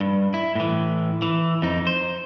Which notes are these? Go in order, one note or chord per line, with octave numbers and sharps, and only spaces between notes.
G2
E4
A2 E3
E3
F2 D#4
C5